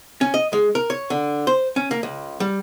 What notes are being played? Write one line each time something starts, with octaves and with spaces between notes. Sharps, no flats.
C#4
D#5
G#3
A#4
C#5
D3
C5
C#4
A#3
C#2
G3